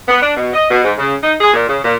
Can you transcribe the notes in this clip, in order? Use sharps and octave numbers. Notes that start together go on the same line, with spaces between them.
B3
D4
B2
D#5
B2
G#2
C#3
D#4
G#4
A#2
C#3
A#2